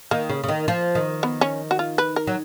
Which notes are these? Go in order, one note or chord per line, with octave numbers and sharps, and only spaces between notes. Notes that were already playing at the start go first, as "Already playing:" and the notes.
D#3 A#3
C#3
C#3
D#3
F3
D#3
B3
C#4
F#4
F4
B4
A#4
F#3